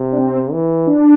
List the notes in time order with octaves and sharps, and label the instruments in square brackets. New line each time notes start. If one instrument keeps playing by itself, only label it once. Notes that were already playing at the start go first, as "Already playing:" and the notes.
Already playing: [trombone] C3
[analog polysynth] D4
C4
[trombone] E3
[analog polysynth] D4